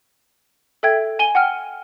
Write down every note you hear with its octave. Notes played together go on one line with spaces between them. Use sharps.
A4 E5 G5 G#6
G#5 D#7 G7
F#5 G5 F6